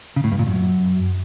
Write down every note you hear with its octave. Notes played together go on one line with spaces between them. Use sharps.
C#3
A2
G2
A#2
F#2